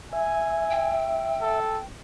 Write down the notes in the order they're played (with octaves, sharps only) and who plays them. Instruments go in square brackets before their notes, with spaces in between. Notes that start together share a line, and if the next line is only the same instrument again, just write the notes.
[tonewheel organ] E5 [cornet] G#5
[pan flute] G5
[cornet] A4